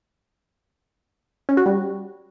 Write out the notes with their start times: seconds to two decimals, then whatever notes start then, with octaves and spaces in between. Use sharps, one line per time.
1.49 C#4
1.57 F#4
1.66 G3